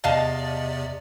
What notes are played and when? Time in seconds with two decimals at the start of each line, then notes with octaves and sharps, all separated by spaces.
0.04 E2 C3 D5 D#5 F5 A5